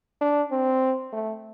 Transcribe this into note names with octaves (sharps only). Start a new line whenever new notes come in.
D4
C4
A3